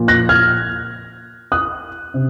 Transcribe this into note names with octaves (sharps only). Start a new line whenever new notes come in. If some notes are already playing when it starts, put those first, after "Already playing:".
Already playing: A#1 A#2
F#6 A#6
F6 G#6
D#6 F#6
C3